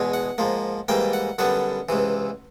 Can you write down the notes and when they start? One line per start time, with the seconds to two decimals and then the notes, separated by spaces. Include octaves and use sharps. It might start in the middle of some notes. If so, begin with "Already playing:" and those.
Already playing: E2 B2 G#3
0.14 F#5
0.38 G#2 F3 A#3
0.88 G#2 E3 G3 A#3 G5
1.13 F#5
1.38 F#2 D3 G3 B3 F#5
1.89 C#2 C3 E3